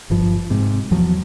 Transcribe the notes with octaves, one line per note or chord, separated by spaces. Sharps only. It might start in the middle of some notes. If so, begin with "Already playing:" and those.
G1 G2 F3
G#2 C3
E2 F3 F#3